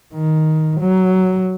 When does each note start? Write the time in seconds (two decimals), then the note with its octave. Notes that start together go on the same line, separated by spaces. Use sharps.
0.14 D#3
0.81 F#3